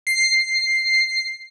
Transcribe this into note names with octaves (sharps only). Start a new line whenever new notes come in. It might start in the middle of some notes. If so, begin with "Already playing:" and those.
C7